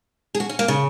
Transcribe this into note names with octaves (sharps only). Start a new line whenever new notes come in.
G#4
F#4
C#4
A#3
C#3